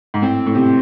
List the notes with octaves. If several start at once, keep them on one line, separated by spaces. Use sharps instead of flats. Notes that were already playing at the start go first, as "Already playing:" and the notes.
G#2
A2 C4
A2
C3